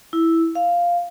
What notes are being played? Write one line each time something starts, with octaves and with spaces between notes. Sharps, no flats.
E4
F5